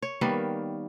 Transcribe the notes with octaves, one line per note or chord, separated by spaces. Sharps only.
C#5
D#3 G3 A#3 B3